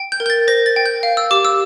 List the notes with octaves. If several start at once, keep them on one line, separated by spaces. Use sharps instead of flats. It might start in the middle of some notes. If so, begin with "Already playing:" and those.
Already playing: G5
G6
A#4
G6
A6
C5 A#6
A6
G5
G6
F5
E6
G4 D6
E6